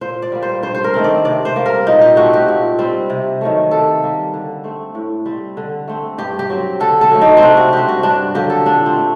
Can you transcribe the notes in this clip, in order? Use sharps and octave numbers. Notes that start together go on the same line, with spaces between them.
A#2 C5
D5
G3 A#3
C5
G2 C5
C5
A#4
D#3 A3 C4
D5
C3 D5
C5
G3 A#3
A#4
A#2 D#4
G4
A3 C4 F#4
G4
A#2
G3 C4
C3
D#3 F#3 A3
C3 A4
G3 A#3
D3
A3 C4
A2
G3 C4
D3
A3 C4
G2 G4
G4
F#3 C4
D3 A4
A4
F#3 A3
D#4
C4
C3 D4
F#4
G3 C4 G4
F#4
G2 D4
D3 F#3 A#3 G4
A4
A#2 D4
C4
A3